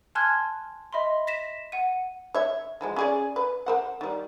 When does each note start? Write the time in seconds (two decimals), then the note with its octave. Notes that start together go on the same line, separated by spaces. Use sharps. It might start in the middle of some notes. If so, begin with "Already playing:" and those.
0.15 G#5 A5 C6 F6 F#6 G#6
0.93 D#5 E5 B5 C6
1.27 A#6 B6 E7
1.72 F#5 D#7
2.35 C#5 E5
2.81 E3 F3 G#3
2.96 C#4 G#4 D5
3.36 B4
3.66 A#4 C5 F#5
4.01 D#3 G3